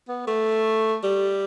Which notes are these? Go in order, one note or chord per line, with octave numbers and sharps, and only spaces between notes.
B3
A3
G3